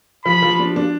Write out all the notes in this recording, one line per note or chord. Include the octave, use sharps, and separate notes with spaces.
F3 B5
F3
D4
D4